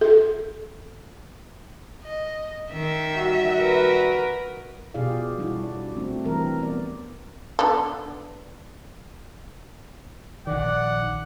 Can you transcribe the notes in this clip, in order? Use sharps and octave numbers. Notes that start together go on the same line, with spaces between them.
A4
D#5
D#3 E5
G3 F#4
A#4 B4
B2 F4 G4 G#4 D5 F5
G3 D4 E4 F#4
D5
A3 C4 D4 F#4
E3 G3 C4 A#4
B3 D5
D3 B3 A4
A#1 D#3 D5 F#5